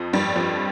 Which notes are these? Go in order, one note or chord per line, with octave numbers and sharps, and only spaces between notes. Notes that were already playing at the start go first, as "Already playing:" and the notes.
Already playing: F2 F3
G2 G3
F2 F3